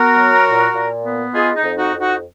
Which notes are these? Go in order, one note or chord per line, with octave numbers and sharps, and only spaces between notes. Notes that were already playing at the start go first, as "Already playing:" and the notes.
Already playing: B3 F#4 A#4
F#3
A#2
A#2
B3
G#3 F4 G#4
D#4
F2
D#4 F#4
F2
D#4 F#4